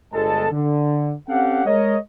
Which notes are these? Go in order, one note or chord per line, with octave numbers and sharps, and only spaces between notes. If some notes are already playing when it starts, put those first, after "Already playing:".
G1 G#3 A4 A5
D3
C4 C#4 G4 A4 F5 F#5
G#3 A#4 C#5 D#5